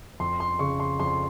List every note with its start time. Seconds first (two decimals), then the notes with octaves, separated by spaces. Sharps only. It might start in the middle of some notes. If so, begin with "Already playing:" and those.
0.20 F2 C6
0.40 C6
0.59 C#3 C#6
0.80 C6
1.00 F2 C6